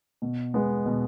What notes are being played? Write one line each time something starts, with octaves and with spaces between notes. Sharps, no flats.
B2
G#3 B3
B2